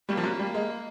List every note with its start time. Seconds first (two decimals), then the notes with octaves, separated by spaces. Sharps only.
0.09 G3 A#3
0.17 F3
0.23 F#3
0.39 G3
0.54 G#3